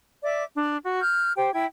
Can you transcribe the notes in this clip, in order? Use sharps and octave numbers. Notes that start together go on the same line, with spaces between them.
D5 E5 D6
D4
F#4
F6 G6
G4 C5 G5
E4 G5 G#6